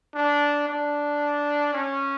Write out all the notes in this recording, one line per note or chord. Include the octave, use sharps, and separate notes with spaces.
D4
D4
C#4